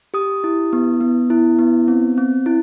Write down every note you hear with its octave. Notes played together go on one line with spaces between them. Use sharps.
G4 D#6
E4
B3
B3
E4
B3
C4
C4
E4